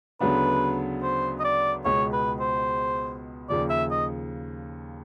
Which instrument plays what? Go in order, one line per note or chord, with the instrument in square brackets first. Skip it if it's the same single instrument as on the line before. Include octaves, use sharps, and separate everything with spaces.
[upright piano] D2 C#3 F#3 B3 D4 [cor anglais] B4
[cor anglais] C5
D#5
D5
[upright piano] C#2 B2 G#3 B3 [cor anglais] C#5
[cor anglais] B4
C5
[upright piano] D#2 C#3 F3 [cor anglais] D5
[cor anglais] E5
D#5